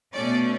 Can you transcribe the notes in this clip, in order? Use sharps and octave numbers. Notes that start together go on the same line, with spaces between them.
B2 A3 C#4 D5